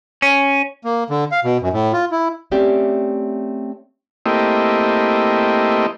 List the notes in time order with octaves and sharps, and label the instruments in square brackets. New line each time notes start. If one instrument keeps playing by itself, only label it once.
[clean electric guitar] C#4
[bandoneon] A#3
D3
F5
B2
F#2
A2
F4
E4
[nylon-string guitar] A3 C4 C#4 G4 D5 E5
[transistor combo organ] A3 A#3 C4 E4 G4 D#5